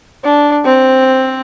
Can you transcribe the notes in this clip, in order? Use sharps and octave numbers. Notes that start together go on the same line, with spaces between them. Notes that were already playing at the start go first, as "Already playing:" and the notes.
D4
C4